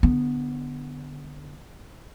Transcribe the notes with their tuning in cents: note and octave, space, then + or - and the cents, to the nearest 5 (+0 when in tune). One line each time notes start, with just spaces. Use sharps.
D3 +0 B3 +0